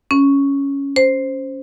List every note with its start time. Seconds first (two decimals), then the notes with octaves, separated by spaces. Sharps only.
0.11 C#4
0.96 C5